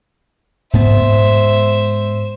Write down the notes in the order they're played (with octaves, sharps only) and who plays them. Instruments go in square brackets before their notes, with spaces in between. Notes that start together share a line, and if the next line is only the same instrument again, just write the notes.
[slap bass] G#2 B3 [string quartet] C5 E5